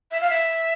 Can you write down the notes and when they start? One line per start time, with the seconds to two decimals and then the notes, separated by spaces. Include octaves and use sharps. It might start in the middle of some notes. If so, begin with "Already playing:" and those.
0.11 E5
0.21 F5
0.30 E5